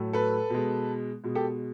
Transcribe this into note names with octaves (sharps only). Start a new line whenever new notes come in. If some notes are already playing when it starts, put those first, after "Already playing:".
Already playing: A2 F#3 A3
A4 B4
B2 G#3
B2 G#3
G4 A4